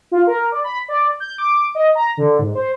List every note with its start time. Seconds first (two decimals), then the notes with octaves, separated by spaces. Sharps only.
0.12 F4
0.27 A#4
0.52 D5
0.64 B5
0.88 D5
1.20 G6
1.38 D6
1.75 D#5
1.95 A#5
2.17 D3
2.39 G#2
2.55 C5